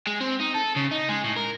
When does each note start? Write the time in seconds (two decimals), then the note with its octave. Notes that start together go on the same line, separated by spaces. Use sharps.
0.07 G#3
0.21 C4
0.40 D#4
0.55 A4
0.76 C#3
0.91 D#4
1.09 G#3
1.24 A2
1.36 A#4